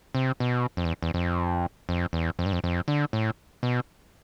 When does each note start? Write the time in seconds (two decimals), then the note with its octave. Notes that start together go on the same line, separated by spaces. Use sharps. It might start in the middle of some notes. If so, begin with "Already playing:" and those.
0.15 C3
0.40 B2
0.77 F2
0.85 E2
1.03 E2
1.14 F2
1.89 F2
2.13 E2
2.39 F2
2.46 G2
2.53 F2
2.64 F2
2.88 D3
3.13 A2
3.63 B2